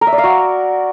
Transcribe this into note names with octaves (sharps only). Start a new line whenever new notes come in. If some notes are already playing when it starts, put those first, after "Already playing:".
A#4
E5
D5
F5
F#4